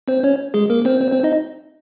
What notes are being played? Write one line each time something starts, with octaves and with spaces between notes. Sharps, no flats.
C4 C5
C#4 C#5
G#3 G#4
A#3 A#4
C4 C5
C4 C5
C4 C5
D#4 D#5